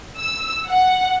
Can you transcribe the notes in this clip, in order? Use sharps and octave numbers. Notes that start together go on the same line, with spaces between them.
E6
F#5